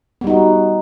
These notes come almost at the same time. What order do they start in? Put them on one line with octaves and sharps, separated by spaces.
B3 G3 D#4 F#4